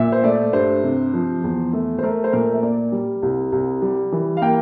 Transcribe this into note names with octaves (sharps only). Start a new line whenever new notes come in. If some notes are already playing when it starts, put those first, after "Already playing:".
Already playing: A#2 E5
C5
A3 D5
G2 C5
C3
F3
E2
A3
C5
A3 A#4
C5
A#2 A#4
E5
A#3 D5
G3
C2
C2
G3
E3
F5
A#3 G5